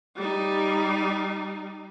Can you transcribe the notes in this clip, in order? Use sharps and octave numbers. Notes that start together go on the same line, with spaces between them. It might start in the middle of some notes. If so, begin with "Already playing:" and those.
G3 D#4